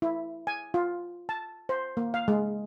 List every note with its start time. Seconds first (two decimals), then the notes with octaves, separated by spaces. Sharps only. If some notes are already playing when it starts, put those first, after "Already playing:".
0.02 E4
0.47 G#5
0.74 F4
1.29 A5
1.69 C5
1.97 A#3
2.14 F5
2.28 G#3